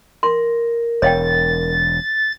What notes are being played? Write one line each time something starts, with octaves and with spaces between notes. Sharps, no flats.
A#4 C6
E1 C#5 F5 G5 A6